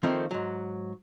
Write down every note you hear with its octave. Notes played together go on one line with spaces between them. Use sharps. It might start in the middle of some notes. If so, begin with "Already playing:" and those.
D#3 F3 A3 A#3 C4 D#4
G#2 F#3